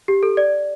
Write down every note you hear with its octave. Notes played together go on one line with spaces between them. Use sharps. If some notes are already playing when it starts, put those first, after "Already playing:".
G4
A4
D5